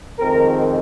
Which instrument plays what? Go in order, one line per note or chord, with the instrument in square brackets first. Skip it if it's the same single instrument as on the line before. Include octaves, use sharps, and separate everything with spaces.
[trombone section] F2 D#3 G#3 C4 A#4